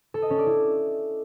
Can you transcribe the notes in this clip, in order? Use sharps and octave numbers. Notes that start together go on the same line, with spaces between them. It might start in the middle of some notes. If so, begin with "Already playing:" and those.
A4
D#5
C#4
D5
E4